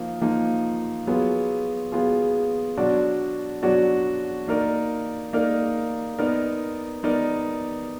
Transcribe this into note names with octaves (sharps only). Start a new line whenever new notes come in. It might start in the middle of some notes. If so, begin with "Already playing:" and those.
Already playing: F3 A#3 D#4
F3 A#3 D#4
F#3 B3 F4 G#4
F#3 B3 F4 G#4
B2 F#3 D4 F#4 D5
B2 F#3 D4 F#4 D5
A#3 D#4 A#4 D5
A#3 D#4 A#4 D5
B3 D#4 A#4 D5
B3 D#4 A#4 D5